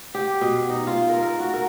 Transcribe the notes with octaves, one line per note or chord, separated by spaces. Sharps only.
G4
B2
D#4
F4
A#4
A#4
F#4
A#4